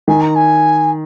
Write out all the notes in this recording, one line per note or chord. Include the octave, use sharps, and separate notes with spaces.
D#3 G#5
A#5
G#5